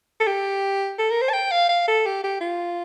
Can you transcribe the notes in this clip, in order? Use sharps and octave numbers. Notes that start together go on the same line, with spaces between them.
A4
G4
A4
A#4
C5
A5
G5
F5
F5
A4
G4
G4
F4